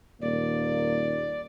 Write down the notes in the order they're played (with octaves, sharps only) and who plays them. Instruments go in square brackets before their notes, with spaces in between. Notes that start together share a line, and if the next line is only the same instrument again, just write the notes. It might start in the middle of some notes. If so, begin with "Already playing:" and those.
[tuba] D#1 [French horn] A#3 [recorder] D5